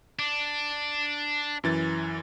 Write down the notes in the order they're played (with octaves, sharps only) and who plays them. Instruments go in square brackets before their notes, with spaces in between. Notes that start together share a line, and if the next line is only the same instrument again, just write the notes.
[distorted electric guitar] D4
[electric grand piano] F#2 E3 A6